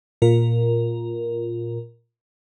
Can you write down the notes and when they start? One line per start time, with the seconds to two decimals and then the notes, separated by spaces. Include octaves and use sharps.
0.22 A#2 F4 A#4